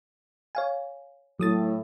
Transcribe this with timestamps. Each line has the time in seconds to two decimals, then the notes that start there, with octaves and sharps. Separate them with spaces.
0.55 C#5 F5 G#5
1.40 A2 F#3 D#6 A6